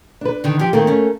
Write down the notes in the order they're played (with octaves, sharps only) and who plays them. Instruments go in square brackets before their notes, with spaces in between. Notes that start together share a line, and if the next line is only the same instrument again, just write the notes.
[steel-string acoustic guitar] D4 B4
[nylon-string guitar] D3 D#3
F3 G4
[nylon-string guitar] D#3 A3 C4 [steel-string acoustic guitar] A#3 A4
[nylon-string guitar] A3 C#4